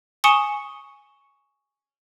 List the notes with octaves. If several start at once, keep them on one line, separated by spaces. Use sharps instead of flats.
G#5 C#6 D#6 C#7 E7 G7